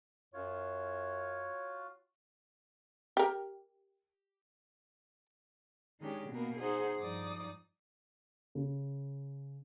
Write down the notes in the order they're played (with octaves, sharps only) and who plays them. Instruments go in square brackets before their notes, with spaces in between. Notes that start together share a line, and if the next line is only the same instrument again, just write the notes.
[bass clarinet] F#2 [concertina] F4 F#4 [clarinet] C#5
[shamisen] G4 A#4
[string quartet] D#3 G#3 C#4 D4 G4
B2 A#3 B3 A#4
D#4 G#4 C5 F#5
G2 F3 D#4 D5 D#6
[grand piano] C#3